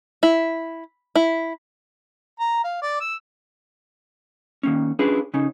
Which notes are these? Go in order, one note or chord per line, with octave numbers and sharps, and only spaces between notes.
E4
E4
A#5
F5
D5
E6
D#3 A#3 C#4
C#4 D4 E4 F4 G#4 B4
C#3 C#4 D#4